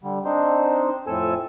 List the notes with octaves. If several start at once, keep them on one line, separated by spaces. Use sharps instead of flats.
D3 G3
C4 D4 D#4 C5
F2 A2 C4 A4 G#5 E6